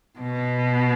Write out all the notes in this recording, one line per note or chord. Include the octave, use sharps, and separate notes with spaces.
B2